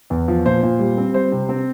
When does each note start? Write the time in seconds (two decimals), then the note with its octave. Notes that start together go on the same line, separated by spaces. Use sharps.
0.10 E2
0.28 F3
0.45 A#2 C5
0.63 A#2
0.79 G3
0.97 C4
1.14 G3 C5
1.32 C3
1.49 C4